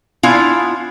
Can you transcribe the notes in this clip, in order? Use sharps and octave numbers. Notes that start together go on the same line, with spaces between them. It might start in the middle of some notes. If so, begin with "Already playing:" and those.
B3 D4 E4 F4 F5 G#5